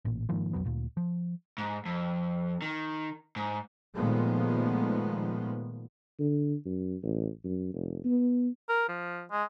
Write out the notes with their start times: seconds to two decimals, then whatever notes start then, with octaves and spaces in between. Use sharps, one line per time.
0.05 A1 A#2
0.29 G#2 D#3 F3 A#3
0.53 B1 F2 F#3 B3
0.66 D2 A#2
0.97 F3
1.58 G#2
1.86 F2
2.62 D#3
3.36 G#2
3.94 A#2 D#3 F3 G#3 A3 B3
6.19 D3
6.66 F#2
7.03 A1
7.44 F#2
7.73 F1
8.04 B3
8.69 A#4
8.89 F3
9.31 G#3